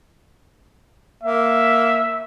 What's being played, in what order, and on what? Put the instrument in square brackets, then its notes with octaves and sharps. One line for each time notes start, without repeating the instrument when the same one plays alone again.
[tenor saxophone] A#3 [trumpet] E5